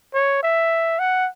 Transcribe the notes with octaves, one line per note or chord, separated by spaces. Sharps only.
C#5
E5
F#5